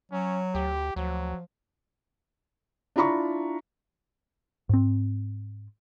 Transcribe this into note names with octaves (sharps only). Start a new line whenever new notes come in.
F#3 C#4
D2 G4
D2 F3 F#3
D4 E4 F4 A#5 B5 C#6
G#2 C4